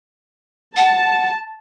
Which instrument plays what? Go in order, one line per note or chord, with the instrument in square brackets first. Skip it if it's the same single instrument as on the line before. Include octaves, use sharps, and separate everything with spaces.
[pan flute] F#5 [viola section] A5